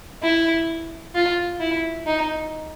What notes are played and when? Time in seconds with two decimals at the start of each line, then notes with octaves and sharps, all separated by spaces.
0.23 E4
1.15 F4
1.60 E4
2.06 D#4